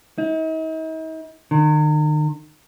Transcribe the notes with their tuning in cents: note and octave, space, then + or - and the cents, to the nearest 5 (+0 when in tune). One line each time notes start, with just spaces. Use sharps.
D#4 +45
D#3 -40